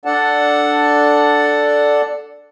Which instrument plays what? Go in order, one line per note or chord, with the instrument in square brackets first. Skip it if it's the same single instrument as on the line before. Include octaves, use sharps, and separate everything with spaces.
[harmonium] D4 A4 D5 F#5 A5